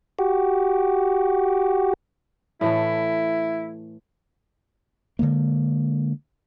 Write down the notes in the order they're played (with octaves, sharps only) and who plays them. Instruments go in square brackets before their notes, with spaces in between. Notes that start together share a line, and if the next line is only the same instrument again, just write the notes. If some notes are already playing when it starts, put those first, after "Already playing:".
[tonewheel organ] F#4 G4
[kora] A2 E3 A3 [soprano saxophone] E4
[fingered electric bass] D3 F3 G#3 A#3